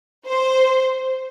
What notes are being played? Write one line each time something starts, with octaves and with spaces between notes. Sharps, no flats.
C5